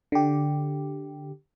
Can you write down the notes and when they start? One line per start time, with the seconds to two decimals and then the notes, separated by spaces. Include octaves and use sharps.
0.12 D3 G4